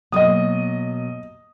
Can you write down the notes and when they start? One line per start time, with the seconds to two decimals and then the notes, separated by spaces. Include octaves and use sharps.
0.12 B2 F#3 A#3 D#5 D#6